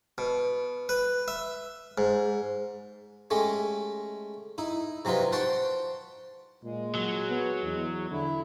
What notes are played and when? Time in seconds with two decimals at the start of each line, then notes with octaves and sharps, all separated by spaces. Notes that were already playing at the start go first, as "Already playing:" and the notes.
0.18 B2
0.89 B4
1.28 E5
1.98 G#2
3.31 G#3 A3 C#4 G4
4.58 D#4 E4
5.05 C3 F#3 D#4 F4 B4
5.32 C5 F#5 G5 A5 C6 C#6
6.64 A#2 G#3
6.95 F#3
7.30 B3
7.63 E2
8.11 D3 E4